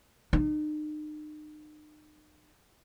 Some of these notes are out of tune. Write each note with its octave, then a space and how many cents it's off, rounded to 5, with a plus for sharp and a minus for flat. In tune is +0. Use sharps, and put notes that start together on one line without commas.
D#4 -40